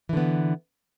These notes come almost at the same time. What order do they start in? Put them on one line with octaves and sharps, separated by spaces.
E3 D3 B3